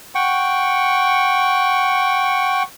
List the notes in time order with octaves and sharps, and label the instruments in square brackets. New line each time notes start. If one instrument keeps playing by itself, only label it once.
[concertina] F#5 G5 C#6